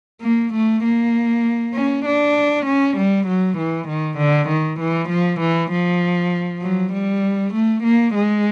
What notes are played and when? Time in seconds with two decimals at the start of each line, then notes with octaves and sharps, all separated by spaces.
0.22 A#3
0.53 A3
0.84 A#3
1.74 C#4
2.05 D4
2.66 C#4
2.97 G3
3.28 F#3
3.58 E3
3.88 D#3
4.18 D3
4.48 D#3
4.80 E3
5.09 F3
5.40 E3
5.71 F3
6.62 F#3
6.93 G3
7.54 A3
7.84 A#3
8.14 G#3